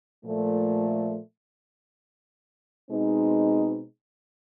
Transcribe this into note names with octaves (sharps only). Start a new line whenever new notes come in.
A#2 F3 A3
B2 G#3 C4 D#4